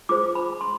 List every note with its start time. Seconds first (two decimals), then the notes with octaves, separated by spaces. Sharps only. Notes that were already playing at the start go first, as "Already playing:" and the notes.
0.09 F4 G#4 C5 D6
0.35 B5
0.61 C6